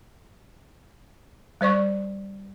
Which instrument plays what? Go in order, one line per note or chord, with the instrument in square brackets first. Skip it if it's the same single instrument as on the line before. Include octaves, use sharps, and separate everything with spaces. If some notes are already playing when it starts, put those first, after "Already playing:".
[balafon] G3 C5 D5 C#6